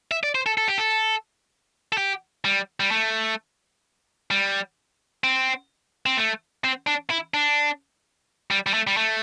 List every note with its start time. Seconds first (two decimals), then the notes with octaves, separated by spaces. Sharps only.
0.11 E5
0.23 D5
0.35 C5
0.46 A4
0.58 A4
0.68 G4
0.78 A4
1.92 A4
1.98 G4
2.45 G3
2.80 G3
2.91 A3
4.31 G3
5.24 C4
6.06 C4
6.17 A3
6.64 C4
6.87 D4
7.10 E4
7.34 D4
8.51 G3
8.67 G3
8.74 A3
8.87 G3
8.97 A3